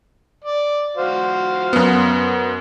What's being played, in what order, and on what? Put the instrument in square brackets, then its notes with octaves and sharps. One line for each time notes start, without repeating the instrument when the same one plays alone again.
[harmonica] D5
F#4 C5 F5
[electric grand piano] F#2 B3